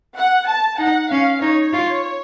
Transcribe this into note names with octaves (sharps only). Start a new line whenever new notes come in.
F#5
A5
D#4 F#5
C#4 F5
D#4 C#5
F4